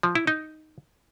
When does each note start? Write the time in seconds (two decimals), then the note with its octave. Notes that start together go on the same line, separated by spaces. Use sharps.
0.03 F3
0.15 E4
0.27 D#4